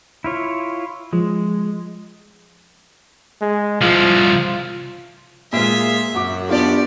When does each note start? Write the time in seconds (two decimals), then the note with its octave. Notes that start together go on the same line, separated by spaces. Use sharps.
0.24 E4 F4 C#5
1.13 F3 G#3
3.42 G#3
3.82 C2 F3 F4
5.53 A#2 G#3 A#3 F4 G#4 E5
6.15 F#2 F#4 D6
6.49 B3 D4 F4 G4 D5